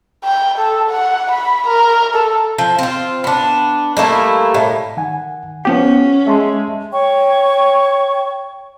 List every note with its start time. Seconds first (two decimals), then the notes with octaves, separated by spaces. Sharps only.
0.24 G5
0.58 A4
0.90 F#5
1.31 B5
1.68 A#4
2.15 A4
2.58 F3
2.79 C4 F4
3.24 B3 D4
3.97 G3 A3 A#3 E4
4.54 A2
4.97 D#3 F#5 G#5
5.65 F3 B3 C#4 G4 F#5
6.27 G#3 E5 A5 C6
6.91 C#5 G5 C#6